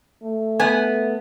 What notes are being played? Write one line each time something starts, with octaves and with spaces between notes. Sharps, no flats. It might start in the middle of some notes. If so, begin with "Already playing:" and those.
A3
B3 G#5